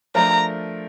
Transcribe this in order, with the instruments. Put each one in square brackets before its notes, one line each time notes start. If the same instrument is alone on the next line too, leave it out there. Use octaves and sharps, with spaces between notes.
[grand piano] F3 A3 D4 F4 A#4 [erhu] A#5